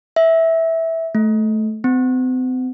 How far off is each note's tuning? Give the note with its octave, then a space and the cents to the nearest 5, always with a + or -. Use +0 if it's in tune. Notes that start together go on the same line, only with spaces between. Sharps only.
E5 -10
A3 -15
C4 -40